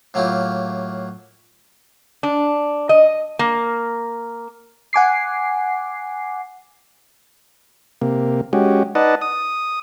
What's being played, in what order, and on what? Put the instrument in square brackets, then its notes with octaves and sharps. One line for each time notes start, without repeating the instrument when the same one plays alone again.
[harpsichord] A2 F#3 A#3 E4 F4 G4
[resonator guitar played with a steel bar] D4
D#5
A#3
[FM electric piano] F#5 G#5 D6 C7
[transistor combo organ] C3 A#3
G#3 C#4 F#4 G4
D#4 B4 D5 D#5 F#5 A5
D#6